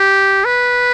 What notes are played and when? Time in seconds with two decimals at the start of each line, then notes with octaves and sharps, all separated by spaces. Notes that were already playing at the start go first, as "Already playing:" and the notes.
Already playing: G4
0.45 B4